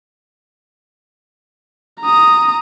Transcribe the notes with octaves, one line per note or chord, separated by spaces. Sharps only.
A#5 D#6